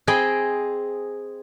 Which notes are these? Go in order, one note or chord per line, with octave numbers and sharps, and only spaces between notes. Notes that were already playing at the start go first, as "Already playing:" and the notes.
C4 G#4 C5 D#5 G5 B5